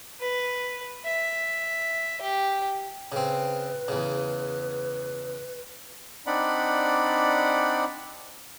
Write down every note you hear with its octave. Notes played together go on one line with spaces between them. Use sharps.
B4
E5
G4
C#3 C4 B4
E2 C#3
C4 D4 D#4 D5 F#5 B5